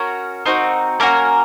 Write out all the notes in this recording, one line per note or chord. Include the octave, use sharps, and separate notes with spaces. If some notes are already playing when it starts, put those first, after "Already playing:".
Already playing: C#4 F#4 A#4
C4 D#4 F#4
A#3 C#4 F#4 A#4